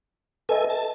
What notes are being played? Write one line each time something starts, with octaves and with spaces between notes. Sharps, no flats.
A4 B4 D#5 E5 G#5
A5